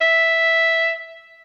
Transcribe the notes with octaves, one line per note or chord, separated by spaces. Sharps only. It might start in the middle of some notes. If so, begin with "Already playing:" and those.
E5